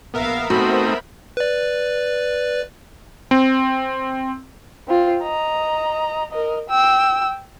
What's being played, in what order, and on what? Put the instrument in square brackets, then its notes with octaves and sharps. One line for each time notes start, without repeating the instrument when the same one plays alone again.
[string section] A#1 F5 [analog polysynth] B3 A#4 E5
[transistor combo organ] A3 C4 D#4 [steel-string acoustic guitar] F#4 [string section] C5 B5
[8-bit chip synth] B4 D5
[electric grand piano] C4
[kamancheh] C4 F4
D#5 A#5
A#4 D#5
G5 E6